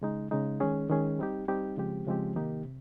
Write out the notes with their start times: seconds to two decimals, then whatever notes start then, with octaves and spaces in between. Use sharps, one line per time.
0.01 C#3 G#3 D#4
0.31 C#3 G#3 D#4
0.60 D#3 G#3 C#4 G#4
0.90 D#3 G#3 C#4 G#4
1.19 G3 C4 D#4 G4
1.48 G3 C4 D#4 G4
1.77 C#3 F3 G#3 C4 G4
2.07 C#3 F3 G#3 C4 G4
2.36 C3 D#3 A#3 D#4 G4
2.65 C3